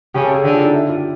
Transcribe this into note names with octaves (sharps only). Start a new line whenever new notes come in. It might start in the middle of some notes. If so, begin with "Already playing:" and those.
C#3 G4
A4
G#4
D3 G4
F4
D#4
E4
F4
G4